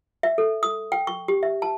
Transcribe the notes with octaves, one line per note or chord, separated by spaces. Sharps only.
E5
A4
D#6
G5
C#6
G4
E5
A5